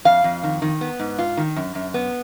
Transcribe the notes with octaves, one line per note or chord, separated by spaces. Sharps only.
F2 F5
F2
D#3
D#3
B3
G#2
F4
D#3
F#2
F#2
B3